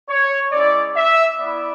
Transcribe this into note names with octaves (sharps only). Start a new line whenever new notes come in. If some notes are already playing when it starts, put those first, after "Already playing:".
C#5
G#3 C#4 E4 D5
E5
B3 E4 D5